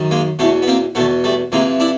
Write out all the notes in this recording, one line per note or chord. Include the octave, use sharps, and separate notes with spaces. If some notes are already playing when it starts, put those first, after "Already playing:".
Already playing: F#2 D#3
G#3 A#3
E2 B2 A3 B3
B3
A#3 C4
E2 B2 A3 B3
G3 A3
F2 C3 E3 G#3 A#3
D4 E4